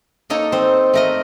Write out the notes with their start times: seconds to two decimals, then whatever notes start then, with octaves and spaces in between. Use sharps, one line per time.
0.30 A#3 D#4 A4 C#5
0.52 C4 C5
0.94 A3 A#4 D#5